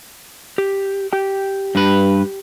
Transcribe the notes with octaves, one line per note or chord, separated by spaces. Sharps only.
G4
G4 G5
G2 B4